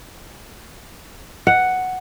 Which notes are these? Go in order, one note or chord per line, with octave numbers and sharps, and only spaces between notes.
F#5